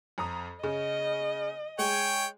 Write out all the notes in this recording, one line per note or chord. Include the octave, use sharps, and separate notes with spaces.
F2 A#5 D#6
C#3 D#5
G#3 C#5 G5 G#5